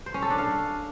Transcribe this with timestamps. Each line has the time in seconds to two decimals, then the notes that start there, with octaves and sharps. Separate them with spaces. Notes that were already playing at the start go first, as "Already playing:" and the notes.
0.06 C5
0.14 C#4
0.22 A4
0.30 D4
0.38 F5